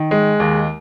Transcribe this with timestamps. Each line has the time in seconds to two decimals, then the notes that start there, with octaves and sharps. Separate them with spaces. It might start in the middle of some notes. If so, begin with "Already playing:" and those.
Already playing: D#3
0.11 G#3
0.40 D#2